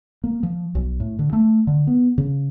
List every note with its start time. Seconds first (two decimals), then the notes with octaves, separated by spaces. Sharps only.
0.24 A#3
0.43 F3
0.75 B1
1.00 A2
1.19 D3
1.33 A3
1.67 D3
1.87 B3
2.18 C#3